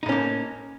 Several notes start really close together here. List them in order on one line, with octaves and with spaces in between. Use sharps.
D#4 A2 C#4 A#3